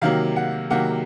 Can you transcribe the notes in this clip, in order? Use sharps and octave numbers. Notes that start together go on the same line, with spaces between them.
C3 D#3 F#3 A#3 F5
F#5
C3 D#3 F#3 A#3 F#5